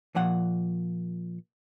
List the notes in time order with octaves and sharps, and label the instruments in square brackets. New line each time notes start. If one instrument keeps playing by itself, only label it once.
[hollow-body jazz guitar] A#2 F3 F#5